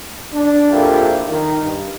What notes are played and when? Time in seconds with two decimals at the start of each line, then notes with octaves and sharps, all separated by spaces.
0.33 D4
0.69 A#1 F2 E4 F4 G4 A#4
1.27 D#3
1.61 G2